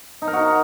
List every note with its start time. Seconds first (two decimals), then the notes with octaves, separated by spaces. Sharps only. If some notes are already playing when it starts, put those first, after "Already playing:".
0.22 D#4
0.27 A#4
0.33 F#4